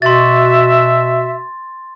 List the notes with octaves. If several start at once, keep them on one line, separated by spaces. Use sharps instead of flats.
B2 F#4 E5 C6 A6